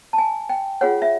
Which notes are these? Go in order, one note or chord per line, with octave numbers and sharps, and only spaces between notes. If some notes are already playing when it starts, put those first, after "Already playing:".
A5
G#5
G5
F4 G#4 C#5 F#5
E5